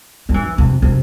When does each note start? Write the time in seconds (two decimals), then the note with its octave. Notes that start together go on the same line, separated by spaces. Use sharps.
0.29 F#3
0.34 E3
0.58 C3
0.82 C3